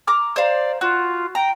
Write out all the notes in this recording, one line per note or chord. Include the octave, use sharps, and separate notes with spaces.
A#5 D6 F6
C5 D5 F5 A#5
F4 F#4
G5 A#5